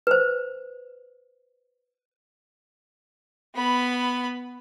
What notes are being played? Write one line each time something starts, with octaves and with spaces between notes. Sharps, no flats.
B4 C5
B3 B5